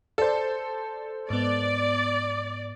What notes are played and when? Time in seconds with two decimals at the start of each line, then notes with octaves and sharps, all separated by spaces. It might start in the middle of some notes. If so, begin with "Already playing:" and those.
0.18 A4 C5 D5
1.30 G#2 B3 D5